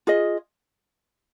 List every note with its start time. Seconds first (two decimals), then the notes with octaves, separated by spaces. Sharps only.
0.07 F4 G#4 D#5